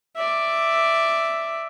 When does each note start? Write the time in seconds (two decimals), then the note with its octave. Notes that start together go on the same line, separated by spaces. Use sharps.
0.16 D5 E5